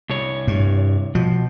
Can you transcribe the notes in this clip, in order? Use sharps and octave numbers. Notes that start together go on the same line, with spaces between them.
C2 C#5
G2
B2 F3